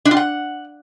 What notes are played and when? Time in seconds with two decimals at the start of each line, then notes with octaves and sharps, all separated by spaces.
0.05 D4
0.11 F4
0.17 F#5